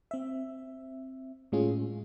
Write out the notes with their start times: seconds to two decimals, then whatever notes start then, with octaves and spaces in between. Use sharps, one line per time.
0.11 C4 E5
1.52 A2 G#3 C#4 F4 G#4